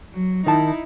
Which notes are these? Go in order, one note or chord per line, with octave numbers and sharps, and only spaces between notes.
F#3
D#3 D#4 E4 A5